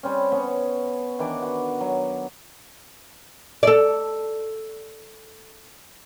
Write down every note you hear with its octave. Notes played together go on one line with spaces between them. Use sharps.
G3 C4 C#4
B3 C#4 C#6
D#3 E3 D4 D6
F#4
F#3
A4 D5